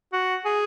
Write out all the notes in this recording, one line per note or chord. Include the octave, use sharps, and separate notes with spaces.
F#4
G#4